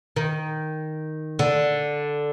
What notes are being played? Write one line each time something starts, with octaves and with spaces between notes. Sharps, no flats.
D#3
D3